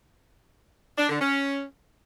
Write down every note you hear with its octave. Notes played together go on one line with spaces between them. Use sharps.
D4
D3
C#4